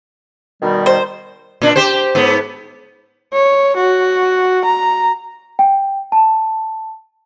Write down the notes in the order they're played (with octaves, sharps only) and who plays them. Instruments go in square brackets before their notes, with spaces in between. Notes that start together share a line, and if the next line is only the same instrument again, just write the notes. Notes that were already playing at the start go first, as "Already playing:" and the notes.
[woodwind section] B2 D#3 G3
[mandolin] C5
[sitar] A#2 D4
G4 C5
G#2 B3
[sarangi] C#5
F#4
A#5
[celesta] G5
A5